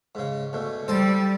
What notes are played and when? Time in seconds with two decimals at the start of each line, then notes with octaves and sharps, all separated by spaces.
0.15 G#2 C#3
0.53 D2 B2
0.88 G3 A4 C5 A5